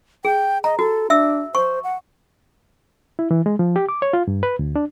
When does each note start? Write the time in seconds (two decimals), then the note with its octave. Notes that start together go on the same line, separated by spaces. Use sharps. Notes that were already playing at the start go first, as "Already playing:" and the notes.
0.25 G#4 G5
0.64 D#5 A#5
0.79 F#4 A4
1.10 D4 E5 E6
1.55 C5 C#6
1.84 F#5
3.19 E4
3.31 E3
3.46 G#3
3.59 F3
3.76 G4
3.89 D6
4.02 C#5
4.13 F4
4.28 G2
4.43 B4
4.59 D2
4.76 D4